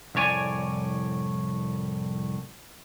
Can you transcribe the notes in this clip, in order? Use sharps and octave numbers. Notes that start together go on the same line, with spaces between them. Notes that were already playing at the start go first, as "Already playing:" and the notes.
C2 F2 A2 C#5 D5 G#5